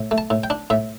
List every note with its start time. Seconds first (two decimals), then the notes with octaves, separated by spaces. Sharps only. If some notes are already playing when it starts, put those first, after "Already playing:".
Already playing: A2
0.11 A3
0.18 A5
0.30 A2
0.44 G5
0.50 D4
0.70 A2 E5